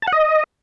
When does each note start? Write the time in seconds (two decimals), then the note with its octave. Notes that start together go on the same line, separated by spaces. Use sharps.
0.02 A5
0.07 F#5
0.12 D#5